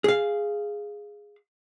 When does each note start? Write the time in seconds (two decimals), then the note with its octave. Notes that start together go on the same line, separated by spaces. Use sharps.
0.04 G#4 F5